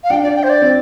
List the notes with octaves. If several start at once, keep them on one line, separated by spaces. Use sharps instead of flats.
F5
D4 G5
D5
G5
C5
D5
C4